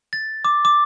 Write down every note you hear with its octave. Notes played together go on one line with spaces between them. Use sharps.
A6
D6
D6